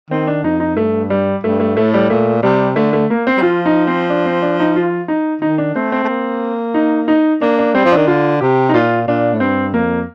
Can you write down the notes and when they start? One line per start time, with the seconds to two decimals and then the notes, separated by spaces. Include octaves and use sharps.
0.11 D#3 C4
0.27 D4
0.44 F2 D#4
0.60 D#4
0.77 G2 A3
1.10 G3
1.44 G2 A3
1.60 A3
1.77 A2 A3
1.94 G3
2.10 A#2 A3
2.43 C3 G3
2.76 D3 A3
2.93 A3
3.10 A#3
3.27 C4
3.38 G3
3.42 F3 F4
3.66 D#4
3.87 C4
4.10 D4
4.25 C4
4.42 D4
4.60 D#4
4.76 F4
5.08 D#4
5.42 D#3 D#4
5.58 D4
5.75 A3 C4
5.92 C4
6.04 A3
6.08 A#3
6.74 D#4
7.08 D#4
7.41 A#3 D4
7.59 D4
7.75 G3 C4
7.85 F3
7.92 D#3 D4
8.07 D3 F4
8.41 C3 G4
8.69 D#4
8.74 A#2 F4
9.08 A#2 D4
9.33 A2
9.40 G2 C4
9.74 F2 A#3